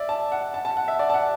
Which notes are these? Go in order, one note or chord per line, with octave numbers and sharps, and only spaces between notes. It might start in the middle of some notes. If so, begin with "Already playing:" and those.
Already playing: D5 E5
A5
F#5
A5
A5
F#5
E5
D5
A5
F#5